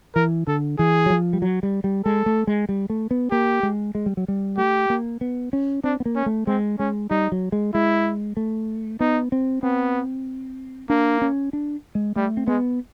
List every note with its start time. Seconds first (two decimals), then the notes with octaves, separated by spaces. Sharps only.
0.15 E3 A#4
0.47 D3 A4
0.79 E3 G#4
1.06 F#3
1.10 F3
1.33 G3
1.42 F#3
1.63 G3
1.84 G3
2.05 G#3 A4
2.26 A3
2.47 G#3
2.69 G3
2.90 A3
3.11 B3
3.31 A#3 G4
3.63 G#3
3.95 G#3
4.06 G3
4.17 F#3
4.28 G3
4.57 A3 G4
4.90 A#3
5.21 B3
5.53 C#4
5.84 C4 D4
6.00 B3
6.05 A#3
6.16 C#4
6.26 A3
6.47 G#3 C4
6.79 G#3 C#4
7.10 G3 D#4
7.32 F#3
7.52 G#3
7.74 G#3 E4
8.37 A3
9.00 B3 D#4
9.32 C4
9.63 B3 C4
10.90 A#3 D4
11.22 C#4
11.53 D4
11.95 G#3
12.16 G3 A3
12.37 C4
12.47 G#3 B3